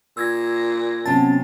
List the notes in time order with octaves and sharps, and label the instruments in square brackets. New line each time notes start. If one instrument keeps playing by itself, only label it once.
[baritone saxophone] A#2 [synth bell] E6 G#6 A#6
[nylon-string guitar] C3 F#3 [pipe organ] B3 C#4 [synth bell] A5 A6